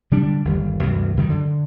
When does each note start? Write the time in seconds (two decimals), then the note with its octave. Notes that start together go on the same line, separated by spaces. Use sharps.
0.11 D3 G3 D4
0.45 G1 D#2 G3
0.82 D2 G2 C3 E3
1.17 F#2 D3 D#3 G3
1.30 D3